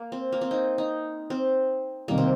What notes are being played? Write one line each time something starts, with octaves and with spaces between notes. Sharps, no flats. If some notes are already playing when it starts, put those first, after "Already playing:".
Already playing: A#3
C4
A#3
C4
D#4
D#4
C4
C3 D#3 G3 A#3
C4